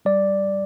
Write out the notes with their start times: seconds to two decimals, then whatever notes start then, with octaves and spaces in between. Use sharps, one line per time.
0.05 G3 D5